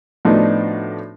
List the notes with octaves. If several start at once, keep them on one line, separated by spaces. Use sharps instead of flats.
A2 F3 B3 D4 D#4 F#4